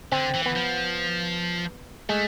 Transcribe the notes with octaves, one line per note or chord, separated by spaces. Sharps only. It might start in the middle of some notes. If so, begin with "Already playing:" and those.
D3 C4
E3
B3
F3
G#3 A3